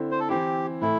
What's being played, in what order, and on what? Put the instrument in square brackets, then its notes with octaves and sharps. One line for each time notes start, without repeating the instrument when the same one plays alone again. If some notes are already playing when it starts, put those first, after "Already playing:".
Already playing: [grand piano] D3 C4 E4
[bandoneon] C5
A4
[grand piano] E3 C4 E4 [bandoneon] G4
[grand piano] A2 E3 A3 [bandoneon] E4